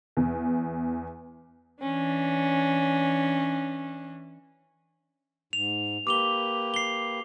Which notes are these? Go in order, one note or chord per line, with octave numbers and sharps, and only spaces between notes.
E2
E3 C#4 D4
G#2 F7
A#3 G4 B4 D6 F7 G7
C7 G7